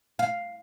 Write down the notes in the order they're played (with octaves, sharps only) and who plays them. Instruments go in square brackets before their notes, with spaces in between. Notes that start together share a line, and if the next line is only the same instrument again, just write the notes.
[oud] F5